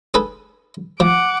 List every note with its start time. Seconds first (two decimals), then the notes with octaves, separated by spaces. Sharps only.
0.14 G#4 A4 B4
1.00 F3 F#5 D6